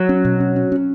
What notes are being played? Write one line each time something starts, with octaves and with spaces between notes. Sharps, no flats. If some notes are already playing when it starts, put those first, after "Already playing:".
Already playing: F#3
C#4
B2
C#4
C#4
C#4